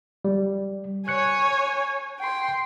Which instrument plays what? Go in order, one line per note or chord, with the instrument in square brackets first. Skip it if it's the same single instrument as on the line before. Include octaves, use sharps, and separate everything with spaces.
[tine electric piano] G3
[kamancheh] C#5 G#5 [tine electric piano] F#6 C#7
[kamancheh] G5 C6